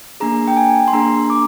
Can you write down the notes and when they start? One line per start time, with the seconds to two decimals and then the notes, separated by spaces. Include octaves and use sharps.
0.20 A#3 D4 G#4 A#5
0.48 G5
0.57 G#5
0.88 C6
0.93 A#3 D4 G#4 A#5
1.30 D6